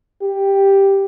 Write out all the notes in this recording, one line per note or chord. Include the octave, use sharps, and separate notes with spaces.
G4